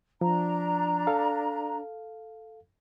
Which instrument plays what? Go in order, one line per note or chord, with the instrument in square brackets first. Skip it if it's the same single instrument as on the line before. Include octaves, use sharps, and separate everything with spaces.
[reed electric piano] F3 [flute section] D4 A#5
[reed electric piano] A4 F5